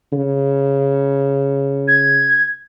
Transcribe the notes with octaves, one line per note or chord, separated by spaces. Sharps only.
C#3
G#6